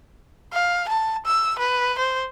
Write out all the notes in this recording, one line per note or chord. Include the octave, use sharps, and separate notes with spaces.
F5
A5
E6
B4
C5